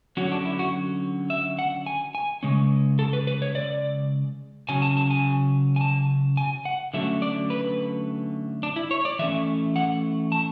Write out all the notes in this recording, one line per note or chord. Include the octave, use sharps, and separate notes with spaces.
D3 F#3 C#4 F#4
D4
E4
F#4
E5
F#5
G#5
G#5
C#3 G#3 C#4
A4
B4
B4
C#5
D5
C#3 F#3 C#4 G#5
A5
A5
G#5
G#5
A5
G#5
F#5
D3 F#3 A3 C#4 E5
D5
B4
D4
E4
C#5
D5
E3 A3 C#4 E5
F#5
A5